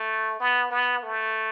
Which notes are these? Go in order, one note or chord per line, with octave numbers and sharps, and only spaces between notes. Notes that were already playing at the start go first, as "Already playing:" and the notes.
Already playing: A3
B3
B3
A3